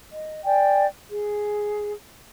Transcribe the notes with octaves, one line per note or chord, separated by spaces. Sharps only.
D#5
D5 G5 G#5
G#4